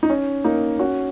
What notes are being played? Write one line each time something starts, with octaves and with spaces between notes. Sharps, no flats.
D#4
C#4
A#3 D#4
C#4 F#4